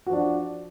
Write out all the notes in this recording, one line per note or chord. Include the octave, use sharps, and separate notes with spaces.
F3 D4 F#4